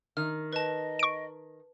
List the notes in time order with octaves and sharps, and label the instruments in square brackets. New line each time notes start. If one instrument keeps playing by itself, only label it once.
[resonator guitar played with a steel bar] D#3 [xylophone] F6
[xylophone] B4 A5 [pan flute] D#5
[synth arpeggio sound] C#6 D7